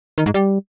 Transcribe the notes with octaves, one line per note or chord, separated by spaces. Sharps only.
D#3
G#2
G3